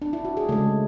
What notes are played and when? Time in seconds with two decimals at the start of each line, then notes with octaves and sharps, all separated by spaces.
0.02 D4
0.13 E4
0.25 F#4
0.37 G#4
0.49 C#3 G#3 A3 A4